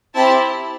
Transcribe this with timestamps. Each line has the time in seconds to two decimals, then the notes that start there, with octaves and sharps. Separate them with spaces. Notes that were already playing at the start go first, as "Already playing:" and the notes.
0.14 C4 E4 G4 A5